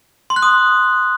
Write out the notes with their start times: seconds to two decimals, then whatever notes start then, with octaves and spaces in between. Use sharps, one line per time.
0.30 C6
0.36 F#6
0.42 D#6